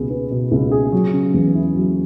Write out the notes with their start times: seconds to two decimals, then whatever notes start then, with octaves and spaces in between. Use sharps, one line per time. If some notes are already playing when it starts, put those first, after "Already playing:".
Already playing: C#2 B2 B3 G#4
0.10 B3
0.31 B2
0.51 C#2
0.71 G#4
0.92 F#3
1.13 C#3
1.34 E2
1.54 E4
1.75 F#3